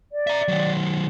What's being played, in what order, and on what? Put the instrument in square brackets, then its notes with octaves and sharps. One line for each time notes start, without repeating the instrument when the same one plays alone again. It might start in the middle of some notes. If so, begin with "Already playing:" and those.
[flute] D5
[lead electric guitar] E5 A#5
D#3 F#3